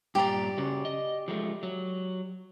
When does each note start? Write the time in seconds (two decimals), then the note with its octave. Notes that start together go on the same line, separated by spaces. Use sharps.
0.15 G2 A#2 G4 D5 A#5
0.58 C#3 C#4 F#4
0.85 D#5
1.28 F3 G#3 A3
1.63 F#3